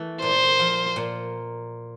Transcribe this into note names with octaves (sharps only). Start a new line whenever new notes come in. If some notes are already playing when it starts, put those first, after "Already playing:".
Already playing: E3 A3
A#2 C5
F3
A#2